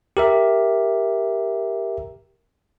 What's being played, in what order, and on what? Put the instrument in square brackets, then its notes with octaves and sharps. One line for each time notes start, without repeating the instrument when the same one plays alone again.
[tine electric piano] G4 A#4 E5